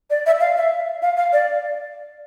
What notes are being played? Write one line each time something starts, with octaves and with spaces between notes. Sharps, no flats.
D5
E5
F5
E5
F5
F5
D5